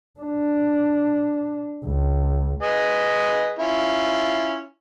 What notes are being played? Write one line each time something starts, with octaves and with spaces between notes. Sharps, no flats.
D4
C#2
G#4 B4 D#5
C#4 E4 F4